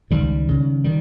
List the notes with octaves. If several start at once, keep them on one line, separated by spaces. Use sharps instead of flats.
C#2 D#3 G3
C#3
D#3 G3